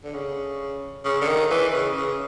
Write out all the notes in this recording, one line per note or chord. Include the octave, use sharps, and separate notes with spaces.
D3
C#3
C#3
D3
D#3
E3
C#3
C#3